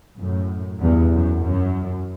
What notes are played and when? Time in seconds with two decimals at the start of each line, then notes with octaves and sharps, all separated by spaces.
0.18 F#2 A2
0.82 E2 G2
1.14 F#2
1.45 F#2